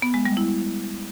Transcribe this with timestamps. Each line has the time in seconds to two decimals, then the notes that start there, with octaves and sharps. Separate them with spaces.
0.02 B3
0.14 G#3
0.25 G3
0.37 E4